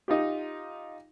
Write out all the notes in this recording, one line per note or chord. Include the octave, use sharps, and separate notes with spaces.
D#4 F4 G4